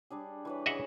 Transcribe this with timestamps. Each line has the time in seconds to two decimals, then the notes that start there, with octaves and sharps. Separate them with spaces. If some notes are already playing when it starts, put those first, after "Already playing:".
0.10 G3 D4 G#4
0.45 E3 B4 C#5
0.66 C#3 G#4 D#5 E5 F#5